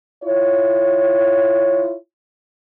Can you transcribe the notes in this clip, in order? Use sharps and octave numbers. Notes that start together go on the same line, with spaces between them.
E4 F4 C#5